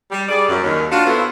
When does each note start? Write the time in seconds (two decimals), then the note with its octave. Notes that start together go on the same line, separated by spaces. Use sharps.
0.11 G3
0.29 G3 G#4 D5
0.49 F#2
0.64 D#2 D#3 C#4
0.92 D4 F4 F#4
1.06 E2 B3 E4 A4 C5 C#5